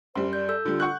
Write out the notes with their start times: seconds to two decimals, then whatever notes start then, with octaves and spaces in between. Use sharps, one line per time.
0.15 F#2 G3 C5 C6
0.33 D5 G6
0.49 A4 E6 G6
0.65 D3 G3 F4
0.80 F#5 C#6 F#6 G6